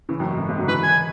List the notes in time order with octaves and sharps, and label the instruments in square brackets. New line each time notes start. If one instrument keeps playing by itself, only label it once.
[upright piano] C#3 E3
F#2 A2
G#2
F#2 A2
G#2 B2
D3 F#3
[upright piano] C#3 E3 [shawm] B4
[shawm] G#5